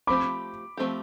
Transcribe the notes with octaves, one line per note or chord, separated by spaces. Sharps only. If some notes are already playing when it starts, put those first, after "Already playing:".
F3 A3 C4 G4 B5 D6
F3 A3 C4 G4